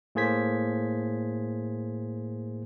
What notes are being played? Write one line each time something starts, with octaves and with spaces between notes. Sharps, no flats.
A2 A#3 G#4 C5 G#6 B6